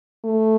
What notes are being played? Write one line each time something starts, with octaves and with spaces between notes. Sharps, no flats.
A3